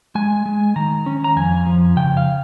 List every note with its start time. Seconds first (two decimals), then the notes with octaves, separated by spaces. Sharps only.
0.15 G#3 G#5
0.46 G#3
0.76 D#3 A#5
1.06 C#4
1.24 A#5
1.36 F2 G#5
1.66 F3
1.97 C#3 G5
2.17 F5